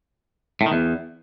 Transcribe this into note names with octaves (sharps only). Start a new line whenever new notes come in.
A2
D#3
E2